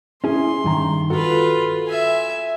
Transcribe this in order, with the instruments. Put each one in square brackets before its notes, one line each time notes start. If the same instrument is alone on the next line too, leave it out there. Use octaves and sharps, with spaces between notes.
[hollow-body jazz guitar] C#4 E4 G#4 [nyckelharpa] C6
[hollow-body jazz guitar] G2 D#3 A#5
[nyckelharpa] F4 B4 [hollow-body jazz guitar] F#4 A4
[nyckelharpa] E5 G#5